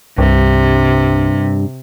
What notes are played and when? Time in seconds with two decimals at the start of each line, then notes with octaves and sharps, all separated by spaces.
0.18 C2 G2 C3